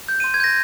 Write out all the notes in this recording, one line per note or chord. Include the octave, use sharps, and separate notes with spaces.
G6
C6 D#7
G#6
G6 A#6